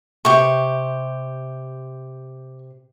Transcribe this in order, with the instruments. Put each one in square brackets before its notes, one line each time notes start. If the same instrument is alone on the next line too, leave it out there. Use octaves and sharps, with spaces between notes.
[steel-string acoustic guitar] C3 [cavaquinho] G4 C#6